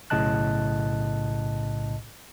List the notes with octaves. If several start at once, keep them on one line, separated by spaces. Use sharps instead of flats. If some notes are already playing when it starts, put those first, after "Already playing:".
B1 A2 C#3 D#5 A5 F#6